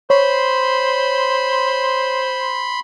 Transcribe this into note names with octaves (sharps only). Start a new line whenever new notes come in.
C5 C#5 B5 C6